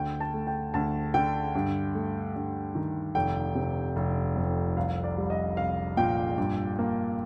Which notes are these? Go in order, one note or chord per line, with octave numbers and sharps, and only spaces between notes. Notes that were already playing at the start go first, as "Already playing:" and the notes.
Already playing: D2 G5
A5
A3
G5
D2 A5
D3 G5
G2
A3
G2
D#3
F1 G5
C3
F1
F2
C2 F5
D5
G3
D#5
C2 F5
A#2 G5
G2
A#3